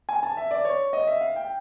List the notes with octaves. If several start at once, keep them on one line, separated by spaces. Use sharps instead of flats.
G#5
A5
E5
D5
C#5
D#5
E5
F5
G5